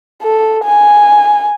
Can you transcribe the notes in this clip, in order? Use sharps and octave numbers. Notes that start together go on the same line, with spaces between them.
A4
G#5